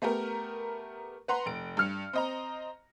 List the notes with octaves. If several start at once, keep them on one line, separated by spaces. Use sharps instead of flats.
A3 B3 G4 A#4
B4 F#5 A#5 C6
F1 D7
G2 F6 C#7
C4 D#5 A#5